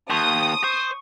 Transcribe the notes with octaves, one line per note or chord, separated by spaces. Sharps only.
D#2 A5 C6 C#6 D#6
C5 C#6